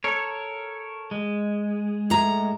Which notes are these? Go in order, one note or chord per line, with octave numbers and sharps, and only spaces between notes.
A4 A#4 C#5
G#3
A2 A#5